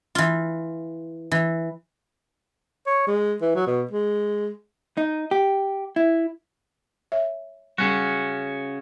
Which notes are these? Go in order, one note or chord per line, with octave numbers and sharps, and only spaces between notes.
E3 F4
E3
C#5
G#3
E3
F#3
B2
G#3
D#4
G4
E4
C#5 E5
C#3 G3 C#4 F#4